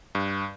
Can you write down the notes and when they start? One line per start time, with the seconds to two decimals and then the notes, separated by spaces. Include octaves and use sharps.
0.15 G2